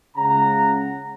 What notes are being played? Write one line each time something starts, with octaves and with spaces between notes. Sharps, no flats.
C#2 C#3 F#5 A#5